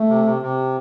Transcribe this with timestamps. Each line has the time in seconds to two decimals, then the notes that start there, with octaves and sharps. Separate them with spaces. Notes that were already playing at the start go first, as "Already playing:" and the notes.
Already playing: A3
0.09 C3
0.25 C3
0.42 C3